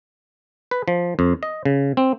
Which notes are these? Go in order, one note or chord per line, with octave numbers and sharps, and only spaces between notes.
B4
F3
F2
D#5
C#3
C4